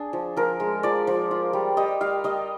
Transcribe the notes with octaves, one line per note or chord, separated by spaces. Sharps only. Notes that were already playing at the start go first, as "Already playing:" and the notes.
Already playing: D4 G#4
F3
F3 A#4
G#3
F3 D5
F3
F4
G3
G3 D#5
G3 F5
G3 D#5